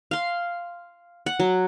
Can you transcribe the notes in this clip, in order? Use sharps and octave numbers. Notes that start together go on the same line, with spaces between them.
F5 C6
F#5
F#3